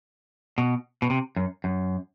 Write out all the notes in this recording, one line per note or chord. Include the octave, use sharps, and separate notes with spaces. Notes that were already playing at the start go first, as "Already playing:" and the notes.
B2
B2
C3
F#2
F#2